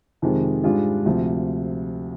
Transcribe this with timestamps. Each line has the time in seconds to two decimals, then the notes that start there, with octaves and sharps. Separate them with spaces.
0.22 F2 C3 D#3 G#3
0.63 G#2 G3 D4 F4 G#4
1.06 D2 C3 F3